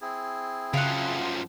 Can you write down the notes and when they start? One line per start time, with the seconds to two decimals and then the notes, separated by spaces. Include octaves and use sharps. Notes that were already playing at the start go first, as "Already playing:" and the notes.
0.02 C4 E4 G#4
0.74 F#2 C#3 F3 F4 F#5